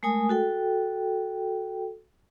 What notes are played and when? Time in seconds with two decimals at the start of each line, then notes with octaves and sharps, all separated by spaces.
0.03 G#3 A3 A#4 G#5 D#6
0.29 F#4 A4 G5